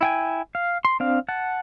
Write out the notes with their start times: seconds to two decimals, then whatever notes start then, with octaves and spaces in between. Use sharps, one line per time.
0.01 E4 G5 G#5
0.55 F5
0.85 C6
1.00 C4 D4 F5
1.29 F#5 A5